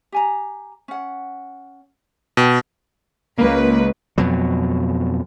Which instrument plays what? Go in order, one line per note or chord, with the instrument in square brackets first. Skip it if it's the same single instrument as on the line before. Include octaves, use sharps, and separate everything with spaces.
[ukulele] G4 G#5 A#5
C#4 F#5
[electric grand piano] B2 [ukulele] C#5 G5
[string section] C#2 B4 [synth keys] A#3
[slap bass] F2 B2 F#3